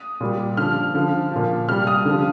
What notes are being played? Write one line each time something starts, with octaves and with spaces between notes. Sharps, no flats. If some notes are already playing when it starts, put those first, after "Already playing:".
Already playing: D#6
A#2 G3
D3 F3 F6
D3 F3
A#2 F3
C3 G3 F6
D#6
D3 F3